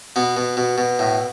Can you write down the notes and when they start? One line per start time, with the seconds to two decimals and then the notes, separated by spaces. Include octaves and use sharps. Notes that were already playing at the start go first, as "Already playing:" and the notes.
0.16 B2 B3
0.37 B2
0.57 B2
0.78 B2
0.99 A2